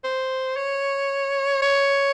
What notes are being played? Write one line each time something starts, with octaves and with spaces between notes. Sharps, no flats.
C5
C#5
C#5